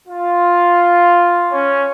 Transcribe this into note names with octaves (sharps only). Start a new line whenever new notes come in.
F4
C#4